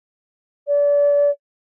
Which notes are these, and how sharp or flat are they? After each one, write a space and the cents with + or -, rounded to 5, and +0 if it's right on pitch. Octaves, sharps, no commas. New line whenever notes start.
D5 -35